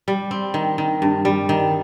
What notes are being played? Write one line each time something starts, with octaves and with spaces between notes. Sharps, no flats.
G3
C4
D#3
D#3
G2
G3
D#3